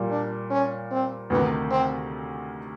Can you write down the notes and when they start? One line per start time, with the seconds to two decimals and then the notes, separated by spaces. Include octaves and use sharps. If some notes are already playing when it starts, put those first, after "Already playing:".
Already playing: A#2 G3 A#3
0.11 D4
0.50 C#4
0.91 C4
1.30 D2 C3 D#3 B3
1.71 C4